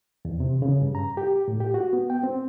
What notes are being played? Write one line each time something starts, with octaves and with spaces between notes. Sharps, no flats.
E2
C3
C#3
G2
A#5
G4
A2
G4
F#4
B3
G5
C4